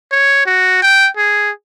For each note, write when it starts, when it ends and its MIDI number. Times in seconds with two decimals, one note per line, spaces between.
0.12 0.44 73
0.46 0.80 66
0.82 1.09 79
1.17 1.51 68